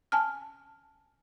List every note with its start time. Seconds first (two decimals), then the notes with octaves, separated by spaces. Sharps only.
0.12 G#5 A5 F6